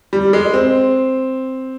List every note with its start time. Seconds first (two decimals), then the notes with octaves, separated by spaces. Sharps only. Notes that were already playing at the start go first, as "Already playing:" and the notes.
0.13 G3
0.33 G#3
0.54 C4